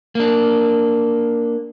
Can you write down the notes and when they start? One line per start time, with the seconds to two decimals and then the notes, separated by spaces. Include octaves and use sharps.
0.15 A#3 D4